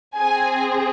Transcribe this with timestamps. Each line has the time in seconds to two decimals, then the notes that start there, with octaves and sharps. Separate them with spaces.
0.17 C4 G#4 G#5